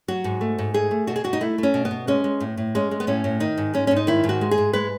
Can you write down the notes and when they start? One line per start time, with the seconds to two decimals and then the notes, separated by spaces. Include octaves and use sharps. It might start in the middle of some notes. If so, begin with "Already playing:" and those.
0.08 F#3 F#4
0.24 G#2
0.41 A3
0.58 G#2
0.74 A3 G#4
0.91 A3
1.07 B2 F#4
1.16 G#4
1.24 B2 F#4
1.33 D#4
1.41 A3 E4
1.58 A3 C#4
1.74 B2
1.85 B3
1.91 B2
2.07 G#3 C#4
2.24 G#3
2.40 A2
2.57 A2
2.75 G#3 C#4
2.91 G#3
3.00 B3
3.07 A2 C#4
3.24 A2
3.40 D#3 D#4
3.57 G#2
3.74 G#3 C#4
3.87 G#2 C#4
3.96 D#4
4.07 D#3 E4
4.24 G#2
4.29 F#4
4.41 G#3
4.51 G#4
4.58 G#2
4.73 G#3 B4